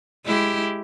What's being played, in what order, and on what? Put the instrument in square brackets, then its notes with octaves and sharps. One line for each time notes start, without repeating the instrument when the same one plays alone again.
[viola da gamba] G#3 E4 G4